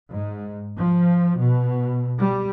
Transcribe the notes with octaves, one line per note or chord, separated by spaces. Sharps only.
G#2
F3
B2
G3